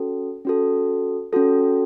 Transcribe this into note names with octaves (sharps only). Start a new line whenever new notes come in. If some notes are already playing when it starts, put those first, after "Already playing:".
Already playing: C#4 F#4 A4
C#4 F#4 A4
C#4 F#4 A4